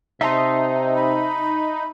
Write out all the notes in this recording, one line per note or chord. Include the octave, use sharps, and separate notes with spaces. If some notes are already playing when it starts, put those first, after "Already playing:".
C3 D#4 E5 A5 C6
B5